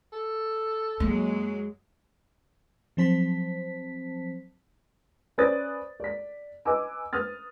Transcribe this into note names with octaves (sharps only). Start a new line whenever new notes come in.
A4
F#2 F#3 G#3 A#3
F3 F#3 C4 C5 A5 B6
C#4 B4 C5 D5 D#6 A6
D5 B6
B4 D#5 G#5 D6 E6
B4 D#6 F6 A6